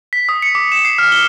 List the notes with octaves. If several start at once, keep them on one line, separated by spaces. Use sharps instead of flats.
B6
D#6
C#7
D6
E7
C7
F6
G7